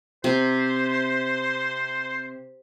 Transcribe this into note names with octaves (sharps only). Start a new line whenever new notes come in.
C3 C5